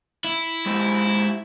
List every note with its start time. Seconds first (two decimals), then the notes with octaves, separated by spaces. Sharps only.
0.24 E4
0.66 G#3 G4 C5